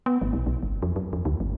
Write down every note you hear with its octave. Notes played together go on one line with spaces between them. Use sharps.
B3
G#1
B1
B1
G1
F2
F#2
F2
D2
G#1